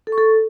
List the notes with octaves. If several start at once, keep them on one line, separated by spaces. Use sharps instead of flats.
A4
C#6
A4